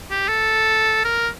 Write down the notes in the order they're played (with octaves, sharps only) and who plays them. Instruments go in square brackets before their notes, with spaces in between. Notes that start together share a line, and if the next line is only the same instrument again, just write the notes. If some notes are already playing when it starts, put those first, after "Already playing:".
[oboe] G4
A4
A#4